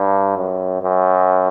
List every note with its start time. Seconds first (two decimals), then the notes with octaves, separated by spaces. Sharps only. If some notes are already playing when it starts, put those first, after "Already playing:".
Already playing: G2
0.37 F#2
0.82 F#2